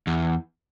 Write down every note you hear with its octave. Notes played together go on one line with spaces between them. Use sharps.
E2